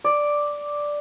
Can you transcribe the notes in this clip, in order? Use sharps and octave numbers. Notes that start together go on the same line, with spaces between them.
D5